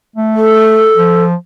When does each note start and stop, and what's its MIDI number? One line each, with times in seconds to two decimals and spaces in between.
0.16 0.88 57
0.36 1.24 69
0.97 1.35 53